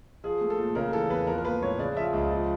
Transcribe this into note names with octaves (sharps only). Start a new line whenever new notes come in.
F3 G#4
A3
A4
A#2
C#3 A#4
E3 A4
E2 B4
F3 A#4
A#4
A#3 B4
A2 C#5
C#3 D5
F3 E5
C#2
F3